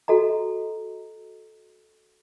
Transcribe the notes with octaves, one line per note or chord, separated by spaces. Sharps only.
F#4 A4 D#5 A#5